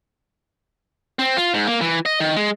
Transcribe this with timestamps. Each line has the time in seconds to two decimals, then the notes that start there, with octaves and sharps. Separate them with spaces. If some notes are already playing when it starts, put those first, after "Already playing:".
1.19 C4
1.37 F4
1.54 G#2
1.67 A#3
1.81 E3
2.06 D#5
2.20 D#3
2.36 G#3